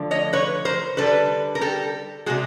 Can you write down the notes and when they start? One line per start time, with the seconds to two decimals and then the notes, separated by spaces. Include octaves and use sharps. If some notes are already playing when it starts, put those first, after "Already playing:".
Already playing: D3 F3 A3
0.11 C#5 D#5
0.33 B4 C#5
0.65 A#4 C5
0.97 D3 G3 A4 B4
1.55 A#4
1.61 G4 A4
2.26 C3 D#3 G#3 F#4 G#4